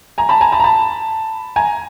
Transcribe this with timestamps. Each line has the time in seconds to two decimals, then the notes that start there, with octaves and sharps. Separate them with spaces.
0.18 G#5 A#5
0.29 A5 B5
0.41 G#5 A#5
0.52 A5 B5
0.60 A#5
0.64 A5 B5
1.56 G#5 A#5